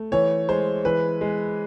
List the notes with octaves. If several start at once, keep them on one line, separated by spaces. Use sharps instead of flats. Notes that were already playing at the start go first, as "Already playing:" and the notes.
Already playing: A3
E3 C#5
G#3 C5
E3 B4
G#3